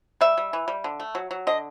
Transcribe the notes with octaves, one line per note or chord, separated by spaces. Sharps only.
G3 E5
G3
E3
G3
D3
A3
F#3
F#3
D3 D#5